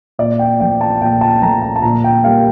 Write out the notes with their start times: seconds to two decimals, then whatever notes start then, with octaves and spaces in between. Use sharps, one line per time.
0.19 A#2 D5
0.39 G5
0.60 F3 A3 G5
0.81 A5
1.02 A#2 G5
1.21 A5
1.42 F3 A3 A#5
1.62 A#5
1.76 A5
1.82 A#2 A#5
2.04 G5
2.24 G3 A#3 F5